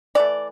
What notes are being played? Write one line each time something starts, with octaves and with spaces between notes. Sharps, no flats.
E3 A3 D5